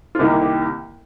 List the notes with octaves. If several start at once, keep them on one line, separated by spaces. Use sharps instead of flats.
F4
C2 C3 D#3 A#3 D#4 G4
G4